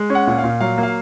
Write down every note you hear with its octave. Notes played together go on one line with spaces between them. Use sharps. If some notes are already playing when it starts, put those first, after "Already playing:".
Already playing: G#3
C#4
F#5
A#2
F5
A#2
F#3 F5
A#3
F5